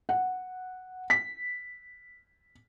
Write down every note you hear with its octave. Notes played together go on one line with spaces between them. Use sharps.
F#5
B6